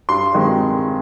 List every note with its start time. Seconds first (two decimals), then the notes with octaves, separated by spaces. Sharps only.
0.09 G2 C6
0.34 D#3 G#3 C4